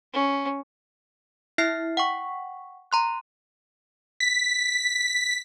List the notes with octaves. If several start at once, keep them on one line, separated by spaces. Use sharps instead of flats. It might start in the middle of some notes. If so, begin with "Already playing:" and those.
C#4
E4 E5 F6 C7
F#5 G5 C#6
A#5 C6 F#6
B6